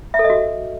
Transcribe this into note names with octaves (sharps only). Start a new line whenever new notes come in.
E5
A4
D#5
F#4